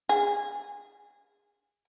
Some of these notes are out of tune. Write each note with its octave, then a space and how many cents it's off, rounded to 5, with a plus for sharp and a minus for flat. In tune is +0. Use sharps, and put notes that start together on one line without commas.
G#4 -20